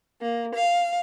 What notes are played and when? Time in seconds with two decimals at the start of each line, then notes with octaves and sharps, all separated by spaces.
0.22 A#3
0.55 F5